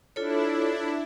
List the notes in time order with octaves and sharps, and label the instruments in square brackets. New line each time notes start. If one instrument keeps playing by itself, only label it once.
[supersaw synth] D4 E4 [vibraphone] F4 A4 C#5